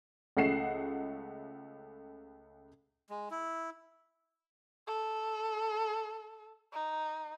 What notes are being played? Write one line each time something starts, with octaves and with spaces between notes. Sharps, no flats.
C#2 A3 F#5 C7 E7
G#3
E4
A4
D#4